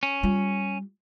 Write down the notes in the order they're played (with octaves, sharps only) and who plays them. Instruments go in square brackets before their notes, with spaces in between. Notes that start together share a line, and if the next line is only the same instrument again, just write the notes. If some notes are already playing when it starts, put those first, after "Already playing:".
[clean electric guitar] C#4
[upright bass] G3 F4